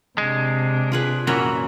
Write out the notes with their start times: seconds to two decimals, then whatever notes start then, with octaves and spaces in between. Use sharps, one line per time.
0.18 C3 G#3 D4
0.92 F4 G#4 B4
1.27 F#2 A#2 E3 C#4 F#4 A#4